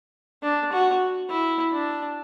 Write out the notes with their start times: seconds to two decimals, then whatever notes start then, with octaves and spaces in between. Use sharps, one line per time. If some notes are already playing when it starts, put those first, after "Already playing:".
0.43 D4
0.73 F#4
1.30 E4
1.73 D4